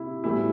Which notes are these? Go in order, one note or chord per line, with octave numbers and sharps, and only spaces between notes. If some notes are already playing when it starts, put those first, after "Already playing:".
Already playing: C3 E4
B1 A2 E3 G3 E4